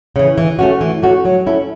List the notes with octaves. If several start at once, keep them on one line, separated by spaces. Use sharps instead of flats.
C#3 E3
E3
A3 C#4 F#4
E3
A3 C#4 F#4
F#3
C#4 E4 A4